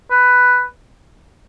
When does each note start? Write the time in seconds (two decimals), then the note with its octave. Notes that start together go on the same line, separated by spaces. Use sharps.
0.11 B4